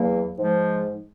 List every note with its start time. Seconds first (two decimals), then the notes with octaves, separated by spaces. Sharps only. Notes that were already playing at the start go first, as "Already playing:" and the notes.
Already playing: E2 F#3 A#3
0.38 G#2 F3 G#3